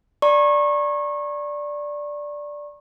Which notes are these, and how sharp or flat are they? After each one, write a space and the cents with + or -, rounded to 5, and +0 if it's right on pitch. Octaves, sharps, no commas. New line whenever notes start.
D5 +0 A#5 +0 C#6 -30